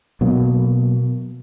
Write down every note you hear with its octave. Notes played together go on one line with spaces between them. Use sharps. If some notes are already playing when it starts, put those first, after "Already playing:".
B2 F#3 A#3